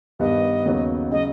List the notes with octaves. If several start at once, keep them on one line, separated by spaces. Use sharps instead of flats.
G2 D#3 G3 B3 D#5
D#2 C#3 F#3 B3
C#3 F#3 D#5